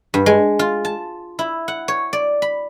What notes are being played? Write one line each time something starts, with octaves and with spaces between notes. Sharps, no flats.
G2
G#3
F4
A5
E4
F#5
C#5
D5
B5